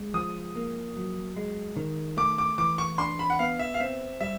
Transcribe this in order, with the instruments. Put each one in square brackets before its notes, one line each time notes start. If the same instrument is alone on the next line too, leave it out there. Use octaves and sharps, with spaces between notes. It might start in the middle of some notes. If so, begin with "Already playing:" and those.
Already playing: [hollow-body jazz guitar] G#3
[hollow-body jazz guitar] F3 [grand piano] D#6
[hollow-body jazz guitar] A#3
F#3
G#3
D#3
[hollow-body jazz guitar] A3 [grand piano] D6
[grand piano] D6
[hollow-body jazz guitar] E3 [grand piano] D6
[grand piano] C#6
[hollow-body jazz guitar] D4 [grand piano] C6
[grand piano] B5
F#5
[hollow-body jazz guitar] B3 [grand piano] F5
[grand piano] E5
F5
[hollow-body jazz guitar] C4 [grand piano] E5
[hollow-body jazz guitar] G3 [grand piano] E5